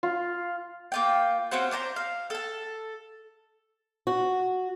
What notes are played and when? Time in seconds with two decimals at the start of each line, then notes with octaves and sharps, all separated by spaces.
0.03 F4
0.92 A#3 F4 G5
1.51 C4 C#4 F#4 C5
1.71 D4 C5 A5 A#5
1.96 F5
2.30 A4 A5
4.07 F#4